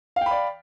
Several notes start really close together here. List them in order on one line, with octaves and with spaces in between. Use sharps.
F5 G5 B5 D5